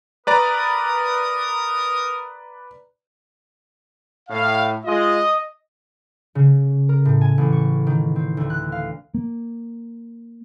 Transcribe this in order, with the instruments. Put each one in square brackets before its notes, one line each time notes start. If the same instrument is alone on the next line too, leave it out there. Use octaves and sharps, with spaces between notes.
[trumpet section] A#4 D#6 [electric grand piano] B4 D5 A#5
[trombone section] A2 [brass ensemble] F5
[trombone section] G#3 F4 [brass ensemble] D#5
[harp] C#3
A#4
A2
G#5
A1
C#6
D#3
C4
D2
F#6
F5
[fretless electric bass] A#3